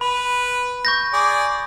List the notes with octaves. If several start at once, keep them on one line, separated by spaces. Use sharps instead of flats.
B4 B5
C#6 G6 A#6
G#4 D5